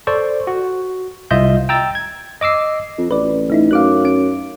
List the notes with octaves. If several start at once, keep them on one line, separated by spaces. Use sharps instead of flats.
A4 C5 D5 C#6
F#4
C2 F4 D#5 E5 G6
G5 A#5 E6 A6
G#6
D#5 D6 E6 C7
F2
A1 B4 D5
A3 D#4 E4
F#2 F5 D6 F#6
C#4 D7